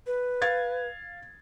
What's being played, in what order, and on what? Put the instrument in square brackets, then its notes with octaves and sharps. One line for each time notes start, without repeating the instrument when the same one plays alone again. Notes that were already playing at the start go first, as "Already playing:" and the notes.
[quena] B4
[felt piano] F5 G#6 A6